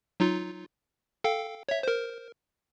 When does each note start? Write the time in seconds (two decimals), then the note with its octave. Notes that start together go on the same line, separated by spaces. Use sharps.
0.20 F#3 D#4 F4
1.24 A4 F5 G5
1.69 C#5 E5
1.83 A#4 C5